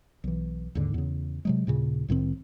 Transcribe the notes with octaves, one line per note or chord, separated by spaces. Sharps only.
B1 E3
D#2 G#2 D3
E2 C#3
C3 F#3 G#3
D#2 A#2 C#3
C2 A2 D#3 C4